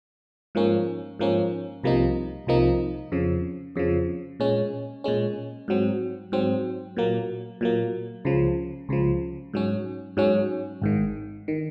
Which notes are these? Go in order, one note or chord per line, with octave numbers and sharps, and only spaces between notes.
G#2 F3 A#3 C#4
G#2 F3 A#3 C#4
C2 C3 F3 A#3 D#4
C2 C3 F3 A#3 D#4
F2 C#3 F3
F2 C#3 F3
A#2 G#3 C#4
A#2 G#3 C#4
G#2 F#3 C4
G#2 F#3 C4
A#2 F#3 A#3
A#2 F#3 A#3
C#2 C#3 F3
C#2 C#3 F3
G#2 F#3 C#4
G#2 F#3 C#4
G#1 G#2 D#3
D#3